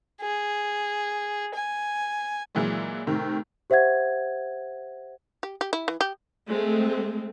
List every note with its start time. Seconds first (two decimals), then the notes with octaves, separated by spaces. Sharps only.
0.22 G#4
1.55 G#5
2.55 A#2 E3 F#3 G#3
3.07 A2 C3 D#3
3.70 G4 C5 E5 F#5 G#6
5.43 G4
5.61 G4
5.73 E4
5.88 E3
6.01 G4
6.49 G#3 A3 C4